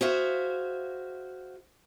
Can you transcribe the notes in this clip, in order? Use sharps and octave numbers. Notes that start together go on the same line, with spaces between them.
F#4 G#4 C5 E5 F5